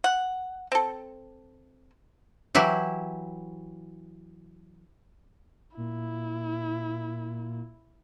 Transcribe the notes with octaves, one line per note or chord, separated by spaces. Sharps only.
F#5
C4 A4
E3 F#3 E4 G4
A#2 E4